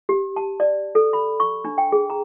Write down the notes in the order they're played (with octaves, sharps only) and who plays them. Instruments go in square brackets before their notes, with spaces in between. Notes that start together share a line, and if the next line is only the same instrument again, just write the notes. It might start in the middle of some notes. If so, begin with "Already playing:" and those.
[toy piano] G4
A5
D5
A4
B5
C#6
D4
G5
G#4
A#5